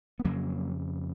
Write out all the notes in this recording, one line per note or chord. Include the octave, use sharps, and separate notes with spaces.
B3
F2 C#3 F#3 A#3